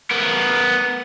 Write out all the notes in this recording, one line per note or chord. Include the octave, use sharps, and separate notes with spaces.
B3 A#4